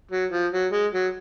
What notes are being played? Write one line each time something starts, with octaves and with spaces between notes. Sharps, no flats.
F#3
F3
F#3
G#3
F#3